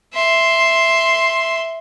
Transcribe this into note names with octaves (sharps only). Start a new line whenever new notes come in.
E5 C6